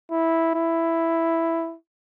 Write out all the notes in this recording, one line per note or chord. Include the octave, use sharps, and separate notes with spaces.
E4
E4